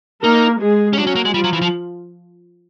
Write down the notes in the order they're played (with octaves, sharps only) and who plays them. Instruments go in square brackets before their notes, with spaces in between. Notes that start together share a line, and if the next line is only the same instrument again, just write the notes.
[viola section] A#3 A#4 [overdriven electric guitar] D#4
[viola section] G#3 G#4
[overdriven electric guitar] C#4
[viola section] F#3 F#4 [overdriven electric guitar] D4
[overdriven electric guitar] C#4
A#3
G#3
[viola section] F3 F4 [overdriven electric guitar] G3
[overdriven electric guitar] F#3
E3
F3